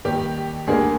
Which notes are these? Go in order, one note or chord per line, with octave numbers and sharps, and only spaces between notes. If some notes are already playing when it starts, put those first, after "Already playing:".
D#2 D#3 G3 G4
D2 D3 G3 A#3 G#4